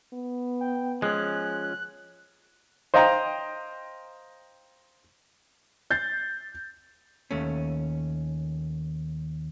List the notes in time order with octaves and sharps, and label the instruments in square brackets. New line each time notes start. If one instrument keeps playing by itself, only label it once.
[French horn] B3
[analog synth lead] G5
[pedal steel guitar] F3 C#4 [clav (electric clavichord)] G#3 [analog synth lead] F#6
[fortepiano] C5 D#5 F5 G5 A#5
[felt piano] G6 A6 C7
[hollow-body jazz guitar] D#2 A3 C#4